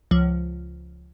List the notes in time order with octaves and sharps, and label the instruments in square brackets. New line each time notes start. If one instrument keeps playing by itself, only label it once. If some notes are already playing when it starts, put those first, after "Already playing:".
[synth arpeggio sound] C#2 F3